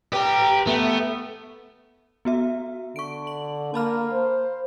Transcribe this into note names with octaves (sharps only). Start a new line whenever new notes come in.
G4 B4 A#5
A3 B3
B3 F#4 E5
D3 C#6 D7
F#7
A#3 A5 B5 F6
C5